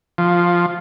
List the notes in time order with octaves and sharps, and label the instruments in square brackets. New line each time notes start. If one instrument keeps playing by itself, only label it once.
[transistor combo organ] F3